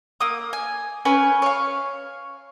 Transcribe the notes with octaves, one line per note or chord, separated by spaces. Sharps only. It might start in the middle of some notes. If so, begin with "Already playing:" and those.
A#3 D#6
G#5
C#4 B4 G#5
C#5 F5